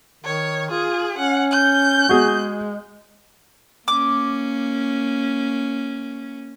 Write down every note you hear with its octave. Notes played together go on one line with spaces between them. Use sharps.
D#3 C#5
F4 G#4
C#4 F#5
G6
G#3 F#4 G#4
A#3 C#4 D6